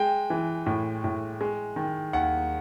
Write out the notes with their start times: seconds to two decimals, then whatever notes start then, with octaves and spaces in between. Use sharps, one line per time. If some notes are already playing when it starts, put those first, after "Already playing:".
Already playing: G#3 G5
0.30 E3
0.66 A2
1.04 A2
1.41 G#3
1.76 D#3
2.13 D#2 F#5